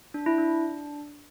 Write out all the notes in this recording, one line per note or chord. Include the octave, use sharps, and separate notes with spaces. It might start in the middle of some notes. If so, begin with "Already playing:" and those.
D4
E4
D4